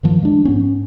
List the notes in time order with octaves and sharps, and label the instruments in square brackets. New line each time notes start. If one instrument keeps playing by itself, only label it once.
[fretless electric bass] G2 D#3 F3
G#3 D4
G#2 B3 C#4